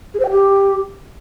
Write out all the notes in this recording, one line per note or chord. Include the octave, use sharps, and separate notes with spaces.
G#4
C5
G5
G4